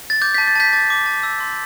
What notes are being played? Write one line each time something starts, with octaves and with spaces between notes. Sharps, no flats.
A6
D6 G6
A5 G6 B6
A6
A5 G6 B6
D6 A6
D6
A5
E6
C6